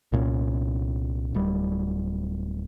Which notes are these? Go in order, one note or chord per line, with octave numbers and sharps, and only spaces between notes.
C2 A#2 G#3 C#4
D1 G3